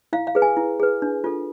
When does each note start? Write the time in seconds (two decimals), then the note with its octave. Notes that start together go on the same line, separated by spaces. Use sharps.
0.13 E4 F5
0.27 F5
0.35 G#4 B4
0.42 G#5
0.57 E4
0.80 G#4 B4
1.02 D4
1.24 F4 A4